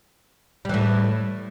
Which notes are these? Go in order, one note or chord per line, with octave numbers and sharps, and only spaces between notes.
A2 E3 G3